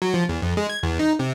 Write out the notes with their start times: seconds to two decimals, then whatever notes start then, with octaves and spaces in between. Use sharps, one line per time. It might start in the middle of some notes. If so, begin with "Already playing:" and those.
0.02 F#3
0.14 F3
0.29 E2
0.42 F2
0.57 G#3
0.69 G#6
0.83 E2
0.99 D#4
1.19 C3